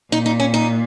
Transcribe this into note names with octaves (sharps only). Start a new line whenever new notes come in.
A#2 D#4
D#4
C#4
D#4